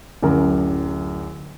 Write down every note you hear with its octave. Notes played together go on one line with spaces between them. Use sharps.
D1 F#2 A#4